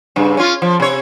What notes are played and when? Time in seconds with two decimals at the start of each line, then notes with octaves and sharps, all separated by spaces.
0.16 G2 C#3
0.37 C#4 F4
0.62 F3
0.80 C3 C#5